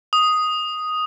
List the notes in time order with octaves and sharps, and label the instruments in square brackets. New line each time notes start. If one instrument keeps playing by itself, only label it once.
[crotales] D#6